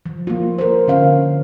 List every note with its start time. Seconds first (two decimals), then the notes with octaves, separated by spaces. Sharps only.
0.06 F3
0.27 A#3 F4
0.58 A#4 C5
0.88 D3 C#4 F5